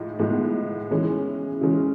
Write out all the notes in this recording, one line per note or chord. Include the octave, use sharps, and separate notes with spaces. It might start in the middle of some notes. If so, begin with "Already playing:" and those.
Already playing: A2 F3 G#3 D#4
A2 F3 G#3 B3 D#4
C#3 E3 G#3 C#4
C#3 E3 G#3 C#4